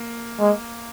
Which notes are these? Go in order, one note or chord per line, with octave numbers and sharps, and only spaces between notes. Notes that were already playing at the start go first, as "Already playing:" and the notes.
Already playing: A#3
G#3